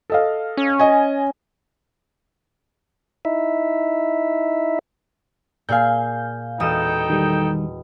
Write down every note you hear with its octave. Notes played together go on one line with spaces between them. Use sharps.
A4 D#5 F5
C#4
D#5 G#5
D#4 E4 E5
A#2 G#4 F5 G#5 G6
E1 D#4 A4 G5 D#6 E7
D#3 G3